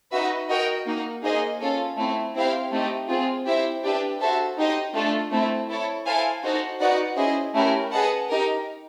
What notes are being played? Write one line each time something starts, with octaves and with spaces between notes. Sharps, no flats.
D#4 F#4 B4 E5
F#4 A#4 D#5 G5
A#3 D#4 F#4
A#3 D#4 G#4 C5 D#5
C#4 F4 A4
A3 C4 E4
C4 E4 G4 C5 F5
A3 C4 D#4 G4
C4 F4 G#4
C4 E4 G4 C5 E5
D4 G4 B4 E5
F#4 A4 C5 E5
D#4 G4 C5 D#5
A3 D4 F4 A4
A3 C4 E4
E4 A4 C#5
E4 A4 C5 F5 G#5
D#4 F#4 A4 C5
D#4 F#4 B4 D5 F#5
C#4 E4 G#4 C5 D#5
A3 C#4 E4 G4 A#4
G#4 B4 D#5 F#5 A5
D#4 G4 A#4